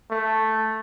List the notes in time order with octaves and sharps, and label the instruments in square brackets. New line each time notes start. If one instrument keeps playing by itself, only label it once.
[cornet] A3